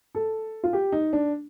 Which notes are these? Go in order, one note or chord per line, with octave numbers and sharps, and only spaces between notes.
A4
F4
G4
D#4
D4